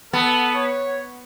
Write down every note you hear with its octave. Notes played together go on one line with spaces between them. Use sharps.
B3 A4
C#5